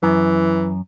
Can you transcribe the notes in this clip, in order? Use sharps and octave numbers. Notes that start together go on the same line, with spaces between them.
F#2 E3